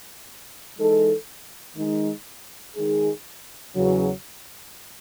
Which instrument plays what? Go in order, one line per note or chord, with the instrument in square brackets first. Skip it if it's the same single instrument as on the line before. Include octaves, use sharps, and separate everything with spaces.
[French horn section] E3 G#3 D#4 A4
D#3 G#3 D#4
D#3 G#3 D#4 G#4
E2 C#3 F#3